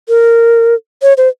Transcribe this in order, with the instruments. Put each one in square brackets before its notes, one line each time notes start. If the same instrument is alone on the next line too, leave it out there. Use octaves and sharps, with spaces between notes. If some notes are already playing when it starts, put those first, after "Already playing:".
[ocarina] A#4
C#5
C5